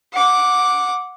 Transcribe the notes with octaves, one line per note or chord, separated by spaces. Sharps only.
F#5 D6